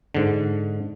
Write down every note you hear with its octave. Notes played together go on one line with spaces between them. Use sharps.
G#2 D3